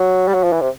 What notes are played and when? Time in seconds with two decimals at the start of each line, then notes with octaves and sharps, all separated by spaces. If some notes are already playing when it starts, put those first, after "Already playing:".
Already playing: F#3
0.28 G3
0.34 F#3
0.43 F3
0.52 E3
0.61 C3